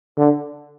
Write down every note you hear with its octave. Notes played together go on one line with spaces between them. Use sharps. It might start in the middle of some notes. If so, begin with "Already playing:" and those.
D3